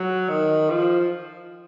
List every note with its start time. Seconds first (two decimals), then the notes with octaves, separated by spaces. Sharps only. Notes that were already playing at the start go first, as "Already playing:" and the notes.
Already playing: F#3
0.29 D#3
0.70 F3